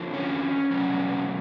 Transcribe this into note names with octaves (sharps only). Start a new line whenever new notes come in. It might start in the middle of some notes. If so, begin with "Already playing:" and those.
Already playing: F2 D3 F3
C#4
E2 B2 F#3 C#4